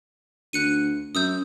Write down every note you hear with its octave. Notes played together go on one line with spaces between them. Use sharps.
D2 F#6 C#7 D#7
F#2 D#6 E6 G6